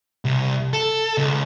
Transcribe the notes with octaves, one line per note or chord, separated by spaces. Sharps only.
C2
A4
C#2